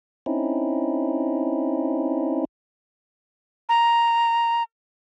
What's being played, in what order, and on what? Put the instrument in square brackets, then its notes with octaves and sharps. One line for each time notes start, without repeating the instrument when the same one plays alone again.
[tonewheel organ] C4 C#4 D#4 E4
[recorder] A#5